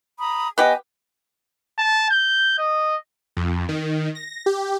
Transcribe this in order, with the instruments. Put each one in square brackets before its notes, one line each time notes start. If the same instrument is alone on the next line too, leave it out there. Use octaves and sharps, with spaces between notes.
[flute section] A#5 B5 D#6
[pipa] B3 G4 [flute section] D#5 G#5
[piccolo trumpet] A5
G6
D#5
[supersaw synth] F2
D#3
A#6
G4